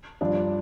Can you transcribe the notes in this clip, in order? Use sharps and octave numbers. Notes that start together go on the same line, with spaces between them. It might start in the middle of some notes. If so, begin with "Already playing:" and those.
G2 F3 D4